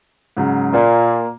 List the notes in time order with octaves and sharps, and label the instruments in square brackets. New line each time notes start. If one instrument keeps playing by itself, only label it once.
[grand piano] G#2 C#3 F#3
[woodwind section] A#2 [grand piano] A#3